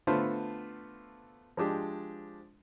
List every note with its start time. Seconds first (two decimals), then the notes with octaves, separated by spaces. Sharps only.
0.07 D3 A3 B3 F4 C5
1.57 F3 G#3 D4 G4